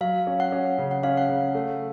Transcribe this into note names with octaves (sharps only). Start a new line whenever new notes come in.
F#3 F5
C#4
F#5
C#4
C#3
F#5
C#4 F5
F#5
C#3
A3